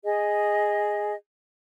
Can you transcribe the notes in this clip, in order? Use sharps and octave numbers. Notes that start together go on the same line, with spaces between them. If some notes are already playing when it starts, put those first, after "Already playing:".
G#4 D#5